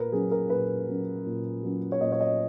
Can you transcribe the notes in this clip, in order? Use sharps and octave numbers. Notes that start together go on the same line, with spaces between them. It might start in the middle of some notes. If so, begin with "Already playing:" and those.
Already playing: A#2 A#4 B4
F#3 C#4 G#4
A#4
A#2 B4
F#3 C#4
A#2
F#3 C#4
C#5
A#2 D#5
C#5
D#5